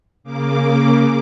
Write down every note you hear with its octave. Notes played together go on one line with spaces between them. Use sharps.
C#3 A#3 D6